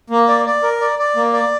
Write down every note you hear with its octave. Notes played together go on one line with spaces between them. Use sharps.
A#3
D5
D5
A#4
D5
D5
A#3
D5